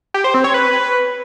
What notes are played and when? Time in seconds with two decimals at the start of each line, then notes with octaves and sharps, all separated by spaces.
0.14 G4
0.24 C5
0.34 C4
0.44 C#5
0.54 B4